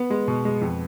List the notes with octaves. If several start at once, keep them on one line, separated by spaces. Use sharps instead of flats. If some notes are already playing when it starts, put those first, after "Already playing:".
Already playing: B3
G#3
B2
G#3
F2